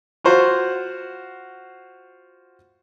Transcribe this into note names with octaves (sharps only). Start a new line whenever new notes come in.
F4 F#4 C5 F#5